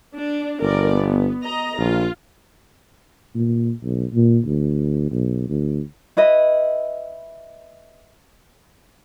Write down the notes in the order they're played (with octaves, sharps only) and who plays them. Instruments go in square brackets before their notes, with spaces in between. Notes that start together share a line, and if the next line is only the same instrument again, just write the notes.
[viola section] D4
[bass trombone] G1 [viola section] A#4 D5
[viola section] B3
D#5 A#5
[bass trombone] A#1 [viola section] F4
[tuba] A#2
B1
A#2
D2
B1
D2
[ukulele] E4 B4 D#5